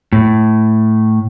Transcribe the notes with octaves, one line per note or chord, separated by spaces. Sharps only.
A2